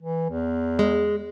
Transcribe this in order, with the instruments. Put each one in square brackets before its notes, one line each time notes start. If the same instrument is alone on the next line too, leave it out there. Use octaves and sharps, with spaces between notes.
[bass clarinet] E3
E2
[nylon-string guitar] G#3